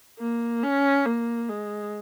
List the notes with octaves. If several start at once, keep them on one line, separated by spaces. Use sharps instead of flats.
A#3
C#4
A#3
G#3